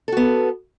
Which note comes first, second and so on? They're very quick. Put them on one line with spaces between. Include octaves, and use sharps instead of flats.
A4 F#4 B3